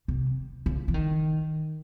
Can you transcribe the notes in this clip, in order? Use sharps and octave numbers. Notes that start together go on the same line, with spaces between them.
C3
C#3
E3
D#3